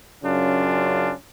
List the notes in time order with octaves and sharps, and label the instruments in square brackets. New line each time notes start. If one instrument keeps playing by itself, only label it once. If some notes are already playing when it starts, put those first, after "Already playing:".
[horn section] F#2 C#3 C#4 D4 F4